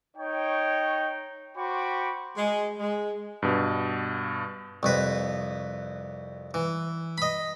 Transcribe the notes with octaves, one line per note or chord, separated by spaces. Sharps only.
D#4 C#5 G5
F#4 C5 G5 B5 C#6 D6
G#3
G#3
G2 B2
C2 F2 B4
E3
D#5 B5